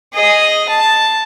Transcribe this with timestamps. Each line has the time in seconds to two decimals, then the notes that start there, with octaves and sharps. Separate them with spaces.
0.13 G#4 D#5
0.69 A5